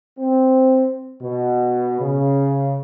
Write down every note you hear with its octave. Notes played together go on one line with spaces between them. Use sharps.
C4
B2
C#3